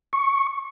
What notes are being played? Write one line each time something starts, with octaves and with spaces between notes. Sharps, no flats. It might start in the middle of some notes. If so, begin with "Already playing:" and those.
C#6